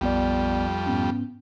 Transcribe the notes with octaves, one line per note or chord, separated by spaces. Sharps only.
A#1 F2 G3 B3 D5
G#2 B3 C#4